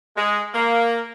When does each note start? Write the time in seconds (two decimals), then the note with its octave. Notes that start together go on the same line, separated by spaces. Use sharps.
0.17 G#3
0.54 A#3